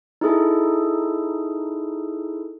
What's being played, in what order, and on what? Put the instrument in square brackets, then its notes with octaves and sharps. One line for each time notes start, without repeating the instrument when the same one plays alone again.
[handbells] D#4 E4 G#4 A4